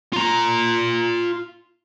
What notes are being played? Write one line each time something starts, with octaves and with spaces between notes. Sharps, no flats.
F4 A#5